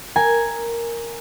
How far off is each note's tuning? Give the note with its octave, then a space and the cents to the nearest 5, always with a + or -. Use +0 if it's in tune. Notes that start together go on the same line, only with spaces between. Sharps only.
A#4 +0 G#5 +0